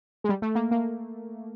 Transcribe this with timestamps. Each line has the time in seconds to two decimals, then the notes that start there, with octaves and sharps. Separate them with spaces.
0.24 G#3
0.29 G3
0.42 A3
0.55 A#3
0.71 A#3